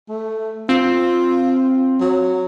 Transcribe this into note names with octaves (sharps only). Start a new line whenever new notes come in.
A3
C4 F4
F#3